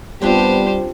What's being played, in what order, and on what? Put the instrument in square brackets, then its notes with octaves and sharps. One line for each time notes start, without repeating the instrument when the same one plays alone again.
[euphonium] G3 [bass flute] B3 [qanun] C4 D4 F4 [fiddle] G4 C5